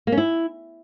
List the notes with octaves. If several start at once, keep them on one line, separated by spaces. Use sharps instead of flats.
A#3
C#4
E4